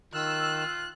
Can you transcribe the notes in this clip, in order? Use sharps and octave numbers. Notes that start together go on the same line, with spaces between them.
D#3 F4 E6 F#6